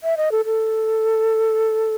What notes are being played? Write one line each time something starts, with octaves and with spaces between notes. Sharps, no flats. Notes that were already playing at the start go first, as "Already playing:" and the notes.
E5
D#5
A4
A4